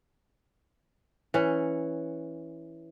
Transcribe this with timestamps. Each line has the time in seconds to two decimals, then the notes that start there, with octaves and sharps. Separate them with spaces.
1.34 E3 C#4